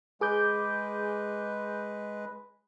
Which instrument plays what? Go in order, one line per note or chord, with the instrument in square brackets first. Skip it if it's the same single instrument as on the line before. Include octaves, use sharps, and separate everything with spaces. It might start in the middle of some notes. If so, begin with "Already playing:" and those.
[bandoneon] G#3 B4 [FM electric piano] G#4 D6 G6